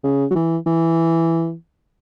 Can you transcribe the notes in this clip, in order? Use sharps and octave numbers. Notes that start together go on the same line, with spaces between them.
C#3
F#3
E3
E3